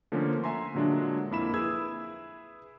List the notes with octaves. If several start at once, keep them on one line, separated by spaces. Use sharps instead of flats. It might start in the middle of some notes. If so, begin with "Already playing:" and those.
D3 F3 A3 A#3 C#4
E5 G#5 A#5 C6
A#2 D3 F#3 G#3 D4
F2 A#3 E4 B5 E7
E4 G#4 B4 E6 G#6